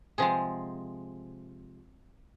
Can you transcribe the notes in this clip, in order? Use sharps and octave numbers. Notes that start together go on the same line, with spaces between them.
C3 F3 G#3 G#4